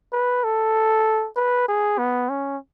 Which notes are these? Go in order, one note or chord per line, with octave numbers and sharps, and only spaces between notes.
B4
A4
B4
G#4
B3
C#4